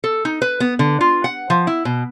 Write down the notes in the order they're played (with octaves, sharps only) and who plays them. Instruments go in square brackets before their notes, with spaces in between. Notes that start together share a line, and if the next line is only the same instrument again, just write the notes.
[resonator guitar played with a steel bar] A4
D#4
B4
B3
D3
F4
F#5
F3
E4
B2